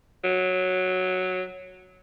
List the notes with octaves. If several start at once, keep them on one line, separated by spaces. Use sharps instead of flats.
F#3